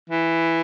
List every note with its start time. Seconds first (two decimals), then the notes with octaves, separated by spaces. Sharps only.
0.10 E3